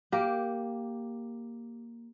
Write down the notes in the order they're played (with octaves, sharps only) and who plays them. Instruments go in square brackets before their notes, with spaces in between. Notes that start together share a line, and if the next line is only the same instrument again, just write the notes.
[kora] A#3 G4